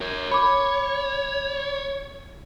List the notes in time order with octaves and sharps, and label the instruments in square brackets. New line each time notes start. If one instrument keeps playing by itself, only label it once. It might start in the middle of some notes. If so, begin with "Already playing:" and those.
[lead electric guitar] A#4 C#5
[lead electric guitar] C#5 [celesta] B5 D6